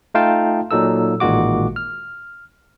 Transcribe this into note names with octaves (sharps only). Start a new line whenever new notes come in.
A3 D#4 F4 F5 G5 A5
A#2 F#3 D#4 A4 E6
A1 A#2 D#3 G#3 F#4 D6
F6